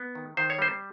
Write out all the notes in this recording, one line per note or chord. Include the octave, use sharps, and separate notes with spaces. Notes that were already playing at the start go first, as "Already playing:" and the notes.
Already playing: B3
D#3
D#3 C5
C#5
G3 C5